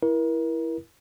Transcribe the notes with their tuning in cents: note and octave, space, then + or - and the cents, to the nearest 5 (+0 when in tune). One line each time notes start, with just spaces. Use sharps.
E4 +0 A#4 +35